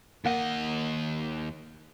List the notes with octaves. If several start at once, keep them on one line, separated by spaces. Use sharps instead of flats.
D#2 A#3 D#5 F#5